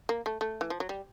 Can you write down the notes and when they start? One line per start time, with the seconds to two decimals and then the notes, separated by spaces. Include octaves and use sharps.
0.09 A#3
0.26 A3
0.41 A3
0.61 E3
0.70 F3
0.80 F#3
0.89 G3